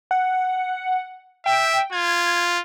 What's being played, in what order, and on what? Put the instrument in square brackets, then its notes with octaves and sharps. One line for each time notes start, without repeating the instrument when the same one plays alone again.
[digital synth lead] F#5
[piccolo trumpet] E5 [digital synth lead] G5
[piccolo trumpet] F4 [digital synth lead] G#6